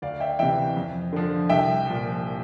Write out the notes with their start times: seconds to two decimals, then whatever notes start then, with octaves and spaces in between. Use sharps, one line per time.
0.02 D2 D5 F5
0.20 E5 G5
0.39 C3 E3 E5 G5
0.76 F2
1.13 D3 F3
1.49 C2 E5 G5
1.87 A#2 F3